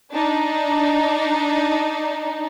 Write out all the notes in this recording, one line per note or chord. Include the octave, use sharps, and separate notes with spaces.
D4 D#4